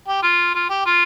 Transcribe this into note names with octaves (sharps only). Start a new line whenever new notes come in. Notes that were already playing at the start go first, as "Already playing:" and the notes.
G4
F4
F4
G4
F4